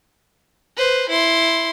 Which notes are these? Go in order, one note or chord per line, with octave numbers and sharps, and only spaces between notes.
B4 C5
E4 C6